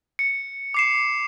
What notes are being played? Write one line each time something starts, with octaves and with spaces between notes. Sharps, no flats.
C#7
D6 C7 E7